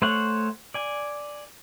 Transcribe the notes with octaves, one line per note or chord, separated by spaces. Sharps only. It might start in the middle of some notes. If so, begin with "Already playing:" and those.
A3 C5 C#5 F#5
D5 G#5